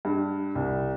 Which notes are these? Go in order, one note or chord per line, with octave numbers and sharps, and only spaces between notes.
G2
C2